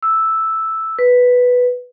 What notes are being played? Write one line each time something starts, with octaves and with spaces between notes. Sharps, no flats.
E6
B4